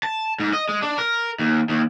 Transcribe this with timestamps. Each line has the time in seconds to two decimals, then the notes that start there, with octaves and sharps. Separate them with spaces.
0.03 A5
0.40 G#2
0.53 D#5
0.69 G#3
0.82 D4
0.98 A#4
1.39 D#2
1.69 D#2